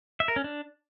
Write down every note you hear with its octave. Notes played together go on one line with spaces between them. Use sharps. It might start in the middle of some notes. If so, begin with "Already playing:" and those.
E5
A#4
C#4
D4